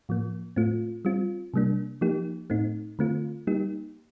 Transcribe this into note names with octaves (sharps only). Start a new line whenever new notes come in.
A2 F3 A#3
A2 A3 C4 F4
G3 C4 F4
C3 G3 A#3 D4
F3 A#3 D#4 G4
A2 A3 C4 D#4
D3 A3 C4 F4
G3 A#3 D#4 G4